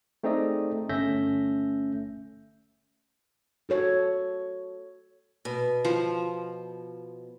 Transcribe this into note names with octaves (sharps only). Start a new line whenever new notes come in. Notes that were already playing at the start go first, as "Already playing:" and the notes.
A3 C4 D#4 G#4 D5 D#5
G1 A3 C#4 E5 G6 A#6
F#4 A4 C#5
B2
F3